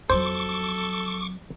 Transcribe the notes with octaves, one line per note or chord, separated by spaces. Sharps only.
F2 F#3 A4 C5 C#6 D6